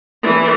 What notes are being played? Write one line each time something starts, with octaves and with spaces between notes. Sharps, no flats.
E3